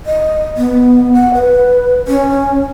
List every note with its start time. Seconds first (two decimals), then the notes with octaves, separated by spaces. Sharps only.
0.06 D#5
0.57 B3
1.14 F#5
1.34 B4
2.08 C#4